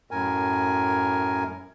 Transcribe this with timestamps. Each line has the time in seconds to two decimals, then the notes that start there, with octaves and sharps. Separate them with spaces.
0.11 F#2 A2 A#4 G#5